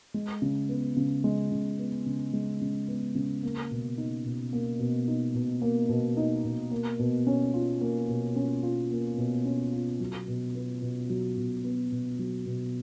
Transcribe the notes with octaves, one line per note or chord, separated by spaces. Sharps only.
G#3
C#3
B3
C#3
G#3
C#3
B3
C#3
G#3
C#3
B3
C#3
A#3
B2
D#4
B2
A#3
B2
D#4
B2
A#3
B2
D#4
B2
A#3
B2
C#4
F4
A#3
B2
C#4
F4
A#3
B2
C#4
F4
F#3
B2
B3
B2
F#3
B2
B3
B2
F#3
B2